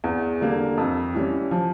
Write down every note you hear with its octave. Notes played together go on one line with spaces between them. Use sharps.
E2
D3 G3 A#3
F2
E3 G3 C#4
F3